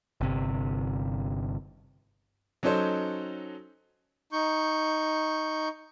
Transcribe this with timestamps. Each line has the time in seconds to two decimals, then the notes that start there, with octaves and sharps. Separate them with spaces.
0.21 G1 C3
2.63 F#3 C#4 D#4 A4 C5
4.32 D#4 C#6 G6